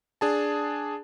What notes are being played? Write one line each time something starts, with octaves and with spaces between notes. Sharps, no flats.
D4 G#4 A5